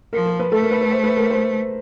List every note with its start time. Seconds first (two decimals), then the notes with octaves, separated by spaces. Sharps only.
0.13 F3 A#4
0.26 A#4
0.40 B4
0.52 A3 A4
0.62 A#4
0.71 B4
0.81 B4
0.91 C5
1.04 B4
1.17 A#4
1.30 C5